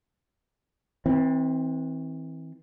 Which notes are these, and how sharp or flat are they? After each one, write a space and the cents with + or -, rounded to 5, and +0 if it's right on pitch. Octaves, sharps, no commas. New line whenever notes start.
E3 -35 C4 +0